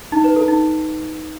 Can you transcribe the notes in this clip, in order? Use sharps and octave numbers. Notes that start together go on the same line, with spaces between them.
D#4
B4
A4
D#4